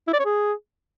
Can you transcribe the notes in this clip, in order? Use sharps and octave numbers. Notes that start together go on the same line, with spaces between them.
E4
D5
C#5
G#4